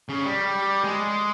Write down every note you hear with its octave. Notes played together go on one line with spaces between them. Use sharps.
C#3
G3
G#3